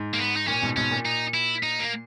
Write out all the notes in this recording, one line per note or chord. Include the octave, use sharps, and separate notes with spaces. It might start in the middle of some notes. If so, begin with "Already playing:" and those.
Already playing: G#2
A#3
B3
D#4
A#2 C#4
G#2 B2
G#2 B2 C#4
A#2
D#4
E4
D#4
A#3